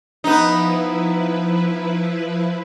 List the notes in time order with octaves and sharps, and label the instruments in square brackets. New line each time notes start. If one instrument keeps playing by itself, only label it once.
[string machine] F3 E4 B4 [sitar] B3 D#4